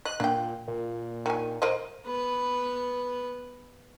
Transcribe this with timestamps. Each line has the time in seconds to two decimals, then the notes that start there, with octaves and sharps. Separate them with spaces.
0.05 D#5 F#6
0.20 A#2 D4 G5
0.68 A#2
1.26 D#3 G#5
1.62 A#4 C5 D#5
2.06 B3 B4